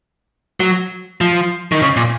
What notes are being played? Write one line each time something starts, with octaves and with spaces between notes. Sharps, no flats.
F#3
F3
D#3
C#3
A#2